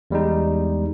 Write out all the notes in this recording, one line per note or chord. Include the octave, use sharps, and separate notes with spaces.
E2 G3 G#3 D#4